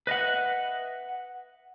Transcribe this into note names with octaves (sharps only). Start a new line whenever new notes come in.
B4 D#5 E5 F#5